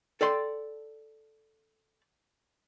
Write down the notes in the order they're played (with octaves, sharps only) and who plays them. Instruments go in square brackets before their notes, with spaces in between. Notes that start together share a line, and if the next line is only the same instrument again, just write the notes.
[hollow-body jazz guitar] A4 D5 G5 C6